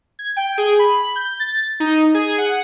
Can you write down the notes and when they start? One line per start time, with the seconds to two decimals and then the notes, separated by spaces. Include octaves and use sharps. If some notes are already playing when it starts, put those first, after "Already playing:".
0.19 G#6
0.37 G5
0.58 G#4
0.79 B5
1.16 G6
1.40 A6
1.80 D#4
2.14 G#4
2.38 F#5